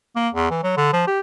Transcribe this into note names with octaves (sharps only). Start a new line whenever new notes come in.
A#3
E2
E3
F#3
D3
F3
G4